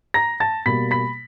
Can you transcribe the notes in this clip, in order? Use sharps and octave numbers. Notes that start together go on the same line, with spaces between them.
A#5 A#6
A5 A6
B2 G3 A#3 B5 B6
B5 B6